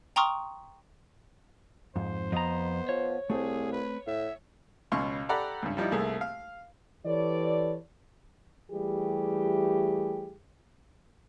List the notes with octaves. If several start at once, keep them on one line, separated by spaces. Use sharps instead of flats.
G5 A#5 C6 C#6 D#6 F6
F2 G#2 C5
F2 B3 D#5 A#5
F3 C#5
C2 A3 C4 G#4
B4
A2 E5
C#2 B2 C#4 F5 C6 C#6
G4 A4 D5 F#5 A#5 B5
C#2 G2
F3 G3 D#4 E4
C2 A3 A#3 G#4
F5
E3 G4 A4 B4 C#5 D5
E3 G3 A3 G4 G#4